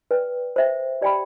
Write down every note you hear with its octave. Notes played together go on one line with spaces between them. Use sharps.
B4 D5 G5
C5 E5 G5
G4 D5 G5 B5